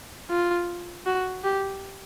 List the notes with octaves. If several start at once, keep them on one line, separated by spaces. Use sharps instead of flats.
F4
F#4
G4